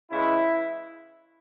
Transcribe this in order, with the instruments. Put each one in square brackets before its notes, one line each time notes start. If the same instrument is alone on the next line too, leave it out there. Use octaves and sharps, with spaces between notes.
[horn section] C#3 E3 G#3 E4